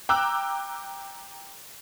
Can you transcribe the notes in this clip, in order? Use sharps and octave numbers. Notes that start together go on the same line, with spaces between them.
G5 A#5 D6 E6 F#6